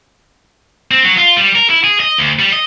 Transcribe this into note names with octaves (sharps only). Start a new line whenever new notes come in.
C4
F#3
F4
G3
A#4
E4
G#4
D#5
D2
G3
D#5